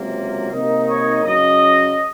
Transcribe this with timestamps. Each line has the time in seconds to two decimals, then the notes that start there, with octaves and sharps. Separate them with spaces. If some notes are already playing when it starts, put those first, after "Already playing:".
Already playing: C#2 C3 F#3 A#3
0.52 C3 D#3 A#3 D#4
0.88 C#5
1.24 F#2 C#3 F#3 C#4 D#5